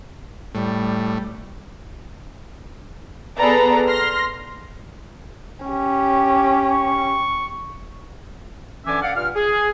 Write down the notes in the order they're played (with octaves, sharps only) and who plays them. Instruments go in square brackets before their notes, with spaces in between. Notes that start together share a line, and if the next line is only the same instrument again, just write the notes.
[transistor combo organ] A2 [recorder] G3
[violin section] B3 G#4 A4 B4 D5 A#5
C6 F6 A#6
[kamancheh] C#4 G4
[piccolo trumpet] C#6
[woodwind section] D3 E3 C#4 E5 G#5 D6
D5 F5 F#5
G2 A#2 F5 F6
G#4